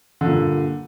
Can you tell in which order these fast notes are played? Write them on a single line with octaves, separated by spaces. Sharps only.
D3 A#2 G2